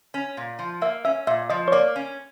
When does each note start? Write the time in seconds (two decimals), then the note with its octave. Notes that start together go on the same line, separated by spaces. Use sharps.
0.14 C#4
0.37 A#2
0.59 F3
0.82 A#3 E5
1.05 C#4 E5
1.27 A#2 E5
1.50 F3 D#5
1.68 C#5
1.72 A#3 D5
1.96 C#4